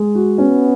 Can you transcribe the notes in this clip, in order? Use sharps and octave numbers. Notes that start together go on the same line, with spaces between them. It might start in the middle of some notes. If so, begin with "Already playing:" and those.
Already playing: G#3
F#4
B3 C#4